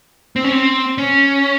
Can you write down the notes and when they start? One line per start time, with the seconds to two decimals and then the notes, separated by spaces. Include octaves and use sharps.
0.36 C4
0.44 C#4
0.53 C4
0.98 C#4